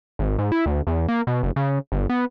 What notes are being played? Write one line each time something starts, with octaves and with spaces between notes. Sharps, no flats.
G#1
G#2
E4
D2
E2
A#3
B2
F#1
C#3
G1
B3